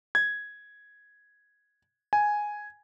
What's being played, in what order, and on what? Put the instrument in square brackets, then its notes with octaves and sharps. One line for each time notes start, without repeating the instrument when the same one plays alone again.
[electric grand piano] G#6
G#5